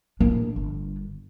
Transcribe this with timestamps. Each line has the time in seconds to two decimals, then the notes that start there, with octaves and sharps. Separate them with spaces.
0.20 A#1 A2 A#3 D4
0.56 G1